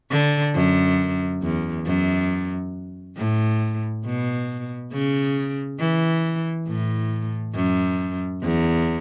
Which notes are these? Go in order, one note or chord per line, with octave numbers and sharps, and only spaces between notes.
D3
F#2
E2
F#2
A2
B2
C#3
E3
A2
F#2
E2